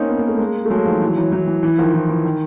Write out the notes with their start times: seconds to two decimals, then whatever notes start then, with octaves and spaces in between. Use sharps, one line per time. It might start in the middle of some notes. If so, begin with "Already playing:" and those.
Already playing: A#3 C4 C#4 D#4
0.09 B3
0.19 A#3
0.29 A3
0.38 G#3 A#3
0.65 A3
0.70 F#3 G#3
0.86 D#3 F3
1.01 E3 F#3
1.16 E3 F#3
1.32 E3 F#3
1.48 E3
1.63 E3
1.78 D#3 F3
1.94 E3
2.09 E3
2.25 D#3